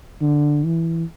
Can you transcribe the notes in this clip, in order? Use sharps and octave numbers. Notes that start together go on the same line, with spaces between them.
D3
E3